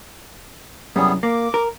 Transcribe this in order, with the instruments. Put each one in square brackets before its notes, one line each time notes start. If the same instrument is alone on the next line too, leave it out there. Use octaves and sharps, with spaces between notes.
[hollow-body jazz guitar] C2 F#2 [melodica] G3 B3 G#4
[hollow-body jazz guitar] A#3 [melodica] D6
[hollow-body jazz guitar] A#4